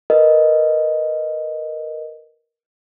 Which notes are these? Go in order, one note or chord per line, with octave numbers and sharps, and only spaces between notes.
A#4 B4 D#5